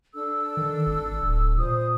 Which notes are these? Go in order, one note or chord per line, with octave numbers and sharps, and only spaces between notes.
D4 A4 E6
D#3
G#1
D1
A#2 C5 D#6